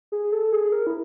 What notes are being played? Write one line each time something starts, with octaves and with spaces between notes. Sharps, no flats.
G#4
A4
G#4
A#4
E4